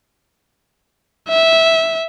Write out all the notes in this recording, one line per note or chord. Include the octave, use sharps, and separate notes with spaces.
E5